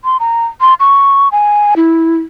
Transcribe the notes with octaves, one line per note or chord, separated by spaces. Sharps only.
C6
A#5
C6
C#6
G#5
E4